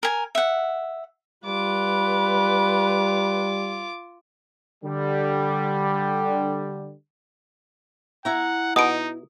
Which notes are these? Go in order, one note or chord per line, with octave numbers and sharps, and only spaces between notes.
A#4 G#5
E5 F#5
G3 F4 B4 D6
D3 G3
E4 F#5 A#5
B2 D#4 D#6 D7